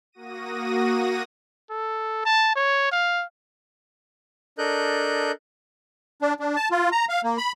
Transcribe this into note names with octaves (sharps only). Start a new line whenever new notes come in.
A#3 F#4 D#6 A#6 D#7
A4
A5
C#5
F5
D4 A4 A#4 D#5 F#6 G6
D4
D4
A5
F4
A#5
F5
A#3
B5